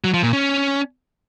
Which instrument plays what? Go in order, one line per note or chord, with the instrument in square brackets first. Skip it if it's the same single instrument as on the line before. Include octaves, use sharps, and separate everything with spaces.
[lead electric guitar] F#3
F3
A#2
C#4